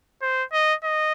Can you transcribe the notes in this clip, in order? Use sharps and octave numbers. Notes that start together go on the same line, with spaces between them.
C5
D#5
D#5